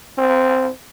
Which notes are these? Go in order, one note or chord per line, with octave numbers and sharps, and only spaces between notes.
C4